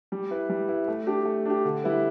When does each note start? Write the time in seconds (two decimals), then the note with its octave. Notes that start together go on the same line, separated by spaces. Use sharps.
0.12 G3
0.31 E4 B4
0.49 G3
0.68 E4 B4
0.88 A3
1.07 D4 G4
1.26 A3
1.46 D4 G4
1.65 D3
1.84 G3 E4 B4